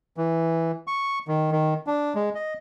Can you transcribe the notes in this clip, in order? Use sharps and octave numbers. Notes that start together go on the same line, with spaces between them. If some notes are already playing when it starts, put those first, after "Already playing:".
E3
C#6
D#3
D#3
D4
G#3
D#5